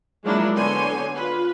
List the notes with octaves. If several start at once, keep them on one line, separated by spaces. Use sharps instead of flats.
F3 F#3 G#3 A#3 D4 E4
D3 B3 C#5 G#5 C6
F4 B4